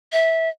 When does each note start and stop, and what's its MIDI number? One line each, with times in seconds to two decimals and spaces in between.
0.12 0.49 76